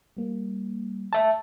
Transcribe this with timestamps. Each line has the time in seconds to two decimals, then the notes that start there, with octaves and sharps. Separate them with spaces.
0.17 G3 A#3
1.13 E5 A5